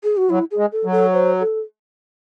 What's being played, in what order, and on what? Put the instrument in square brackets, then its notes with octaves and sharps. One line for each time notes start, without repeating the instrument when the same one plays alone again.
[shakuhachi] G#4
F#4
[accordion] F#3 [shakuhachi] E4
[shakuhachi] G#4
[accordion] G#3
[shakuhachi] A4
[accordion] F#3
[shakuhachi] A4
C5
A4